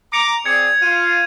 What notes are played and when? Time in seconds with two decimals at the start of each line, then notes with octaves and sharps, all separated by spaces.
0.13 A#5 D6 C#7 F7
0.46 C4 G#4 D5 G#6 C#7
0.82 F4 D#7